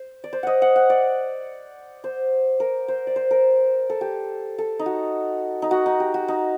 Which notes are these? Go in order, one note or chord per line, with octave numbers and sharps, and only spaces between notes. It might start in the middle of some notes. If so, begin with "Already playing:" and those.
Already playing: C5
D5
C5
D#5 F#5
F#5
F#5
D5
C5
A#4
C5
D5
C5
A#4
A4
G4
A4
D#4
F#4
D#4
F#4
D#4
G4
F#4
D#4